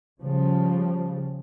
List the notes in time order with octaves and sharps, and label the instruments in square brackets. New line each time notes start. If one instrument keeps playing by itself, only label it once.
[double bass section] C#3 F3 G3